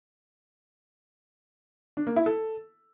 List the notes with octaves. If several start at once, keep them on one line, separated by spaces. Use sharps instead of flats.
D4
A#3
E4
A4